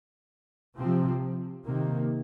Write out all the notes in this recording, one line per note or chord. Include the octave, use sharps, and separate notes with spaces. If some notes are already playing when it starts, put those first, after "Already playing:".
C3 F3 C4
C3 D#3 A#3